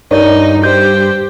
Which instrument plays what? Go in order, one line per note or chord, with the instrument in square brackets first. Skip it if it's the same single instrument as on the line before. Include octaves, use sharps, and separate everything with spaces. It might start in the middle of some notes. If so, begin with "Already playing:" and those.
[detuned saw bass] G2 [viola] D#4 [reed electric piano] A#4 C#5 D5
[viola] G4 C5 [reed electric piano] G6